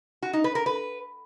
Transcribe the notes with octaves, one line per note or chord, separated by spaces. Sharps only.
F#4
D#4
B4
A#4
B4